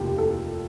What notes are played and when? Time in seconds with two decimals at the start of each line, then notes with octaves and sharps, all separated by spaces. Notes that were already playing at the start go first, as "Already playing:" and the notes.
Already playing: F1 D#2 F4 G4
0.18 A4